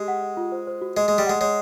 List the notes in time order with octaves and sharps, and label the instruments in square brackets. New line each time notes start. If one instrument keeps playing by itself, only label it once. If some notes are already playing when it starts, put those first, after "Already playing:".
Already playing: [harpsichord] G#3 [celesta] G4
[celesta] F#5
D#5
F4
C5
C5
F#4
[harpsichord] G#3 [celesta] D#5
[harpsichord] G#3 [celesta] D#5
[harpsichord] G3
[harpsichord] G#3 [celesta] F#5
[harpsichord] G#3 [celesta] C#5